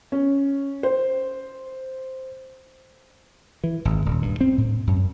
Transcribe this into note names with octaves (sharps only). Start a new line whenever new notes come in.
C#4
C5
E3
G#1
D#1
G2
C4
A2
F#2